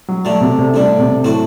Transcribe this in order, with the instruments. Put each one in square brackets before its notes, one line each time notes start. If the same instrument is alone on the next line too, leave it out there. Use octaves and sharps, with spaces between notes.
[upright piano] F#3
[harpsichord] D3 A3 D4 [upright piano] F#3
[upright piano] C3
C3
[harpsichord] A2 G3 D4 [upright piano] D3
[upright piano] C3
[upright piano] A2 [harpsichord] F#3 A3 C4 F#4